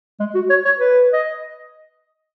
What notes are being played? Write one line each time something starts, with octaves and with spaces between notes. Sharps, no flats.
G#3
F#4
C#5
C#5
B4
D#5